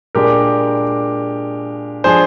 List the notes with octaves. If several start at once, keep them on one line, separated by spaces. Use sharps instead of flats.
A#2 G#3 D4 G4 A#4
F3 G#3 D4 G#4 C5